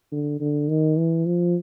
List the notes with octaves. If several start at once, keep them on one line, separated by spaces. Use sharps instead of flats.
D3
D3
D#3
E3
F3